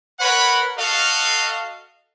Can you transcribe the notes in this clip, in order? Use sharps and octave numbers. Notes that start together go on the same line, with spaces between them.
A#4 B4 C#5 F#5 B5
F#4 A4 D#5 F5